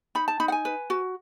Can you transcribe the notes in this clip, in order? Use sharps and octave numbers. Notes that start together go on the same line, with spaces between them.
D#4 B5
A5
D#4 B5
F#5
G#5
B4
F#4